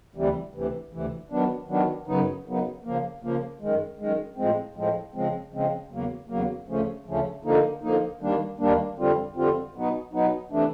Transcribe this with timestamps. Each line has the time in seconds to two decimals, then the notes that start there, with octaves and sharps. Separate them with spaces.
0.15 D2 C3 E3 G3
0.54 D2 C3 E3
0.92 D2 C3 E3
1.30 D#3 F#3 B3 D4
1.69 D#3 F#3 B3 D4
2.07 F#2 C#3 F#3 B3 D#4
2.46 F#2 C#3 F#3 B3 D#4
2.84 C#3 F3 A#3
3.23 C#3 F3 A#3
3.61 F#2 D#3 G#3
3.99 F#2 D#3 G#3
4.37 A2 F3 G#3 C4
4.76 A2 F3 G#3 C4
5.15 C#3 F3 G#3 C4
5.52 C#3 F3 G#3 C4
5.91 E2 C#3 F#3 A#3
6.29 E2 C#3 F#3 A#3
6.68 D2 C#3 F3 A3 C#4
7.06 D2 C#3 F3 A3 C#4
7.45 D3 F3 A#3 D#4
7.83 D3 F3 A#3 D#4
8.21 D#2 D#3 G3 A#3 D4
8.60 D#2 D#3 G3 A#3 D4
8.98 F2 D3 G3 C4 F4
9.36 F2 D3 G3 C4 F4
9.75 B2 F#3 B3 D#4
10.13 B2 F#3 B3 D#4
10.51 C3 E3 A3 D4